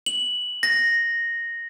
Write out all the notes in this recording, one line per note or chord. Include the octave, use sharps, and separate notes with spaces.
F#7
A#6